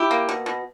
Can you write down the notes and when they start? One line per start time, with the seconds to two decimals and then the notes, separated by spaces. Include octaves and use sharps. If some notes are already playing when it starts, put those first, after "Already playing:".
Already playing: E4 G4
0.11 A#3
0.29 B2
0.46 B2